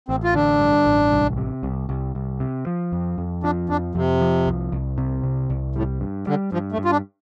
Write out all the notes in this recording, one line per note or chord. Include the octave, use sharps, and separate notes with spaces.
A1 C4
F4
D3 D4
G2
A1
C2
C3
C2
C2
C2
C3
F3
F2
F2
F3 D4
F2 D4
F2 C3
F3
C2
C2
C3
C2
C2
A2 G3
G2
D3 G3
G2 F3
A3
G2
F4
D4